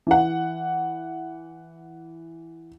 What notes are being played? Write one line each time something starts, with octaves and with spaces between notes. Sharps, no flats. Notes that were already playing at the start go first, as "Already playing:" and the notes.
E3 F#5